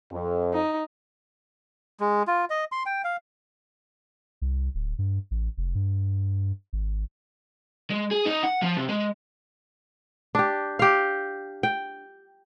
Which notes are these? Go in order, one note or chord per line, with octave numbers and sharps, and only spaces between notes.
F2
D#4
G#3
F4
D#5
C6
G5
F5
C2
D1
G2
A1
F1
G2
G#1
G#3
G#4
D#4
F#5
F3
C3
G#3
D4 G4
G4 F5
G5